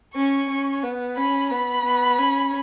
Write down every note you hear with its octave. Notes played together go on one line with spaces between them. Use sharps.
C#4 C#6
C#4
B3
C#4 B5
B3 B5
B3
C#4